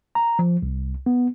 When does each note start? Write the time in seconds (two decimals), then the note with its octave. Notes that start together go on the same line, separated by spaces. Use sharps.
0.15 A#5
0.39 F3
0.62 C2
1.06 B3